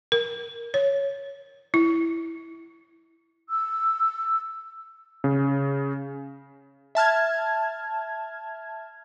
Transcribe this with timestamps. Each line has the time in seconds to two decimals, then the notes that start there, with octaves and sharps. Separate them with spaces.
0.12 A#4
0.74 C#5
1.74 E4
3.51 E6
5.24 C#3
6.95 E5 A5 F6 G#6